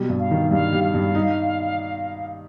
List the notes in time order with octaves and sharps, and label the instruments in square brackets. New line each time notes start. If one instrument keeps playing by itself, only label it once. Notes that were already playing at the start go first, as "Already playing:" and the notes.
Already playing: [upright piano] B2 G3
G2
[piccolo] F5
[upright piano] D#3
[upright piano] G2 [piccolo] F5
[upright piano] G3
[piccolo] F5
[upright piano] G2
D#4